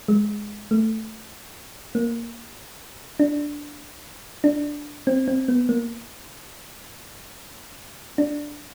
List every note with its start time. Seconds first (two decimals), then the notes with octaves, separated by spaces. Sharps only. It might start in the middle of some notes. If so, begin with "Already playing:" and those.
0.08 G#3
0.71 A3
1.95 A#3
3.20 D4
4.44 D4
5.07 C4
5.28 C4
5.48 B3
5.69 A#3
8.18 D4